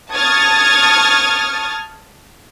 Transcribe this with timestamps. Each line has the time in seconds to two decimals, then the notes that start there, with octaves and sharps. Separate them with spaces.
0.13 A5 C#6 D#6 F6 G#6 A6